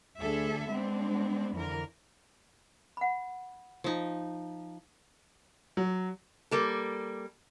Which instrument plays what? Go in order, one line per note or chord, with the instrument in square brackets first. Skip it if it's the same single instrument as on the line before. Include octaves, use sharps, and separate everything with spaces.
[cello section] D2 D4 G#4 A4 E5
G#3 B3 C4 D4
F2 D3 E3 A#4
[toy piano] F#5 B5
[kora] F3 D#4
[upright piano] F#3
[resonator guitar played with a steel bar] G3 A#3 A4